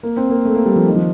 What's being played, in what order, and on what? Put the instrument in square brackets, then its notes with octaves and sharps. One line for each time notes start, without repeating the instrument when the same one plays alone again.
[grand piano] A#3
C4
A#3
A3
A#3
G3
F3
D#3
F3